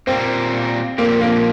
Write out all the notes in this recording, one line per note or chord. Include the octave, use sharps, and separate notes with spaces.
A#2 G3 A#3 C4
A#2 F3 A#3 C4 G4
A#3